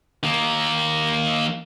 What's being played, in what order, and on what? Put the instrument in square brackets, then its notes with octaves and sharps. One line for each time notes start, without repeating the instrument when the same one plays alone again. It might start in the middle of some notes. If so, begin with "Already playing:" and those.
[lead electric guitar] D#3 A#3